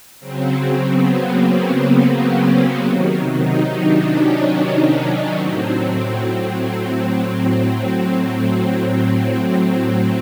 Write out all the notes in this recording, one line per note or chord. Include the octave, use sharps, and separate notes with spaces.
C#3 F#3 C4
B3
A#3
B3
C#4
C3 D#3 F#3
D#4
D4
C#4
A2 F#3 C4
C4